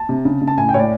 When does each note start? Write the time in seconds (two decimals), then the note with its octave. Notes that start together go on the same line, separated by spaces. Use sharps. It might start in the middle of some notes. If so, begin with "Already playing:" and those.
Already playing: A5
0.09 C3
0.25 C#3
0.41 C#3
0.48 A5
0.58 A2 G#5
0.69 G5
0.74 A2 C#5
0.79 D5